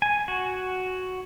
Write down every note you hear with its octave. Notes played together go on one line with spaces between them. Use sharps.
G#5
F#4